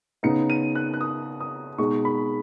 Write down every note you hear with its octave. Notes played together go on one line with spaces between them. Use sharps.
C#3 B3 D#4 C#7
D#7
F#6
F#6
D#6
D#6
B2 G#3 D#4 C#6
B5